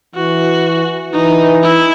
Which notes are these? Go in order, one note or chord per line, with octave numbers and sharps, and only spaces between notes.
E3 F#4
E3 D#4
E4